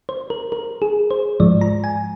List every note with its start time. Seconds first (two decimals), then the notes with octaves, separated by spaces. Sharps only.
0.09 C5
0.30 A#4
0.52 A#4
0.82 G#4
1.11 C5
1.40 G#2 F3 G#3 D5
1.61 A#5
1.84 G#5